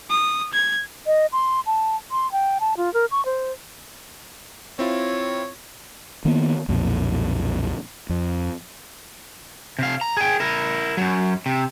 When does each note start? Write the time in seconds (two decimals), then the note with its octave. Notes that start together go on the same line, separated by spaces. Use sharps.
0.10 D#6
0.53 G#6
1.07 D#5
1.32 C6
1.66 A5
2.11 C6
2.32 G5
2.60 A5
2.77 F4
2.94 A#4
3.11 C#6
3.26 C5
4.79 C4 E4 F4 C#5
6.25 D#3 A#3 B3
6.68 B1 F2 A#2
8.09 F2
9.79 C3 F5
10.01 A#5
10.17 G#4 G5
10.40 E4 A#4
10.97 F#2 F#3
11.46 C3